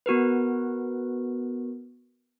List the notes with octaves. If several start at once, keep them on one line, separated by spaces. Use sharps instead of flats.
B3 F#4 A#4 B4